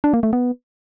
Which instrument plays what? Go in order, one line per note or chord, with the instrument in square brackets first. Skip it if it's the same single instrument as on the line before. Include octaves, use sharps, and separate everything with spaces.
[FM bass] D4
A#3
A3
B3